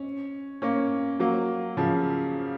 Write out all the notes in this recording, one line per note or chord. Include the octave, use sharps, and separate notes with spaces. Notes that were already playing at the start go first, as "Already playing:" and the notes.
Already playing: C#4
A#3 C#4
F#3 A#3
C#3 F3